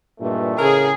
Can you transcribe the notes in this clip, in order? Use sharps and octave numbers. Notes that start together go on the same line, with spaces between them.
G2 A#2 E3 G#3 A3
A2 C#3 G#4 A#4